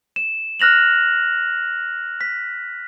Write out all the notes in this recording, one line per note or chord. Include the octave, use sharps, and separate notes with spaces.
E7
F6 F#6 A#6 F7 F#7
B6